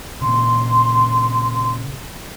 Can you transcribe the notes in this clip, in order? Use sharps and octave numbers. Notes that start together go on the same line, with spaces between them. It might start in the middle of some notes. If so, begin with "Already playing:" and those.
A#2 C#3 C6